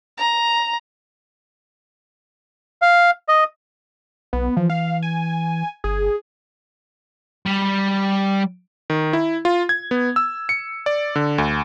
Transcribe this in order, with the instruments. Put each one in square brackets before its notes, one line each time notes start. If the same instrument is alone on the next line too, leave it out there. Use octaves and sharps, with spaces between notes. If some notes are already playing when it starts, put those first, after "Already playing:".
[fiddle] A#5
[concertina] F5
D#5
[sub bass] B1 [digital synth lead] B3
[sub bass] E3 [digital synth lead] F3
[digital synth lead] F5
G#5
[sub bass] G1 [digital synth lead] G#4
[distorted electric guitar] G3
[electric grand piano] D#3
E4
F4
G#6
B3
E6
C#7
D5
D3
D2